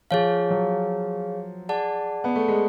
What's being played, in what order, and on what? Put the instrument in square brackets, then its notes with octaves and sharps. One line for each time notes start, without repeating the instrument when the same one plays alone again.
[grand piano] F3 [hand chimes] G#4 C#5 F5
[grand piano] F#3
[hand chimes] G#4 D5 F#5 A5
[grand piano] B3
A3
G#3